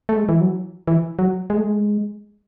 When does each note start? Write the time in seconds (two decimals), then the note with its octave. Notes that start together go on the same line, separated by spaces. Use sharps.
0.09 A3
0.17 G#3
0.29 E3
0.41 F#3
0.87 E3
1.19 F#3
1.50 G#3
1.57 A3
1.65 G#3